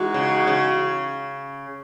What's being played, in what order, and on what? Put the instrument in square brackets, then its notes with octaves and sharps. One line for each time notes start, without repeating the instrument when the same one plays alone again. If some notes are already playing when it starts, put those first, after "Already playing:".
Already playing: [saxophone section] E3 G#3 D#4 F#4
[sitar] C#3
C#3